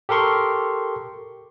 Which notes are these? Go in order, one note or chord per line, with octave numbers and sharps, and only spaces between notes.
G4 A4 A#4 C6 C#6